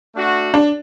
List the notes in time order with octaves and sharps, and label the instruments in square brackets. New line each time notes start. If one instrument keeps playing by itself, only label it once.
[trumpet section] A3 D4 F#4
[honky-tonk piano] D4